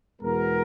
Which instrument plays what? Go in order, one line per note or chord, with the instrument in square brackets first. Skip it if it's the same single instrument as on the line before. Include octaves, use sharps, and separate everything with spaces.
[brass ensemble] E2 B2 G#3 B3 A#4